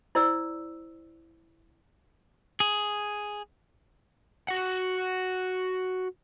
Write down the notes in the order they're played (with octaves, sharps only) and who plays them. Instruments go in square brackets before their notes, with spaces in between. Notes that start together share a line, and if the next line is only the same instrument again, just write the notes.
[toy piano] E4 C5 D5 E6
[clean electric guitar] G#4
[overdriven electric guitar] F#4 F#5